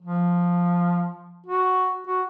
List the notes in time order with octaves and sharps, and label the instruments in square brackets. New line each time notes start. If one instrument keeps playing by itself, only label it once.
[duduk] F3
F#4
F#4